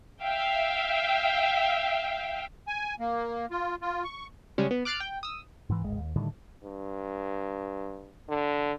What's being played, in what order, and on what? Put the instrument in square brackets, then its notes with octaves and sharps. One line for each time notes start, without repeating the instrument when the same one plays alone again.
[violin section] E5 F5 G5
[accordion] G#5
A#3
F4
F4
C#6
[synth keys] C#3 G3 G#3 C#4
B3
D6 F6 F#6 A6 C7 D7
G5
D#6 E6
[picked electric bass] G#2 E3
D1 G#1 G#3
D#2
A2 D3 D#3 G3
[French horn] G2
D3